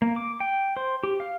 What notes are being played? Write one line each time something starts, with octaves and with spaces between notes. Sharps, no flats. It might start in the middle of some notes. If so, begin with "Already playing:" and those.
A#3
D6
G5
C5
G4
F5